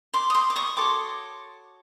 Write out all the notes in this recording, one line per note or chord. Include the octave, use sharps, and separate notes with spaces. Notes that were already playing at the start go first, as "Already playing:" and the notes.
C6 D6
D#6
C6 D6
D6
C#6 D#6
F#4 A4 C#5 C6 D6